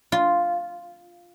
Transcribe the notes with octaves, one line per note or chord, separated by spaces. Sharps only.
F4